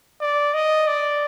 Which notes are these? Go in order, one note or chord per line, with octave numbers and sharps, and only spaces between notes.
D5
D#5
D5